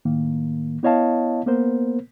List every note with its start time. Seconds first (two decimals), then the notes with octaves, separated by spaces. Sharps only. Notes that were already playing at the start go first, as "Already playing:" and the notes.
0.05 A2 D#3 A#3
0.83 B3 E4 C#5 D#5 F5 A5
1.46 A#3 B3 A#4 C5